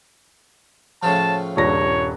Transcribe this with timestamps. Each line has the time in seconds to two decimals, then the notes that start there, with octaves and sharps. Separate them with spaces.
1.03 A2 C#3 F3 A5
1.57 D#1 G2 C#5 A#6